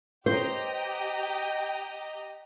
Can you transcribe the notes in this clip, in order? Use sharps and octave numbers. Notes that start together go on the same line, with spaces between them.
G4 C5 D#5 G5 A#5